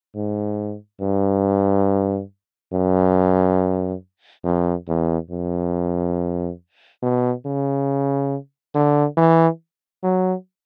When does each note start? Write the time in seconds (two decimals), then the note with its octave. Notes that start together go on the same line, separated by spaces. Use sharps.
0.15 G#2
1.01 G2
2.73 F#2
4.44 F2
4.88 E2
5.31 F2
7.03 B2
7.46 C#3
8.75 D3
9.17 E3
10.03 F#3